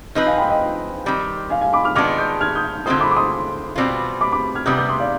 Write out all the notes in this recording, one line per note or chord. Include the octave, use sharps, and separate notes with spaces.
F3 C4 D#4 B4
F5 G#5
G5 B5
D#5 G5
D#3 G3 C4
F5 G#5
F5 G#5
B5 D6
D6 F6
D#3 G#3 B3 D4 F4 D6 F6
D#6 G6
F6 G#6
D#6 G6
D3 G#3 C4 F4 C5 C6 D#6
B5 D6
D6
C6 D#6
B2 G3 C4 F4
B5 D6
B5 D6
F6 G#6
C3 G3 B3 D#6 G6
D#6 G6
C6 D#6
D5 F5